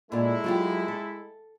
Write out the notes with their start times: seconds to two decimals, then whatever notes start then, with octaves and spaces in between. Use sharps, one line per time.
0.12 A#2 G#3 A3 E4 F4
0.44 F#3 F4 G4
0.88 A4